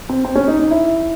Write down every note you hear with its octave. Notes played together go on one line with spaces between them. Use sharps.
C4
C4
C#4
D#4
D#4
E4